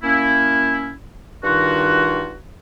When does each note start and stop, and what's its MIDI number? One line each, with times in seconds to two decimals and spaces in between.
0.03 0.92 58
0.03 0.92 61
0.03 0.92 64
1.44 2.33 43
1.44 2.33 51
1.44 2.33 63
1.44 2.33 65
1.44 2.33 66